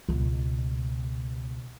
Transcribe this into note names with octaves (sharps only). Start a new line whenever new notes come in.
C#2 B2